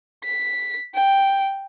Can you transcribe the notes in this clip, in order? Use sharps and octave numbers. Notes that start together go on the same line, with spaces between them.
B6
G5